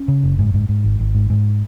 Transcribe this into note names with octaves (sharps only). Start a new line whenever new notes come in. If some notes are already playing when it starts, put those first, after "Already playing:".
Already playing: C#4
C#3
F#1
G#2
G#2
G#2
G#1
G#1
G#2
G#2